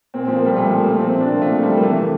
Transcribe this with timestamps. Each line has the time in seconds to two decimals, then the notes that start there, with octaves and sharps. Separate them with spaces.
0.14 A#2 C4
0.25 C4
0.28 F3
0.36 A#3
0.43 A#2 G3
0.56 A#2 A3
0.70 F3
0.78 A#3
0.85 A#2
0.98 F3 C4
1.09 C4
1.13 F3
1.20 D4
1.27 C3 A#3
1.42 F3 A3
1.56 C3
1.62 G3
1.69 F3
1.76 A#3
1.83 E3 A3
1.97 C3